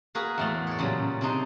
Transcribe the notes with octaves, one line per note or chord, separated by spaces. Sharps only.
A#3 F#4 G#4 A#4 B4
E2 A2 A3
C#5 D5
A#2 C#3 F#3 G3
C3 D4 D#4 C5